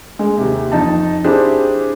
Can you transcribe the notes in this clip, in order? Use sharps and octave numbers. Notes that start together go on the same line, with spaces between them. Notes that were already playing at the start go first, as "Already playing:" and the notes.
G#3
D#2 C3
F2 D#4 A5
C4 D4 E4 G4 G#4